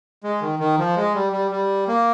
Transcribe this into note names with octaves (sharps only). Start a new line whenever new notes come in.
G#3
D#3
D#3
F3
G#3
G3
G3
G3
A#3